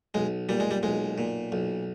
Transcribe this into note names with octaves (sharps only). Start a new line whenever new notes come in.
B1 G#3
A#2 G3
G#3
G3
B1 G#3
A#2
B1